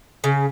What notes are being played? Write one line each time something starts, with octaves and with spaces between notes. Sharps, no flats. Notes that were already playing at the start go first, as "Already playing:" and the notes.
C#3